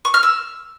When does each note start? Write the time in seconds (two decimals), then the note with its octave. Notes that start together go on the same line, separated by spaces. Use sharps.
0.05 C#6
0.14 F6
0.23 E6